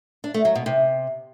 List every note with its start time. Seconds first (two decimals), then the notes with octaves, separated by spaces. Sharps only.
0.24 D4
0.34 A3
0.45 F#3
0.55 B2
0.66 C3